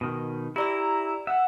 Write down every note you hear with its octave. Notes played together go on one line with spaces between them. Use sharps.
B2 D#3
E4 G4 D5 A#5 E6
E5 F#5